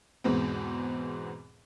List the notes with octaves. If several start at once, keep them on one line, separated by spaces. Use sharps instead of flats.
E2 G#2 B2 B3 C4